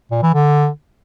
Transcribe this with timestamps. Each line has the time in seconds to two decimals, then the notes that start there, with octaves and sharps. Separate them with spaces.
0.12 A#2
0.23 E3
0.34 D3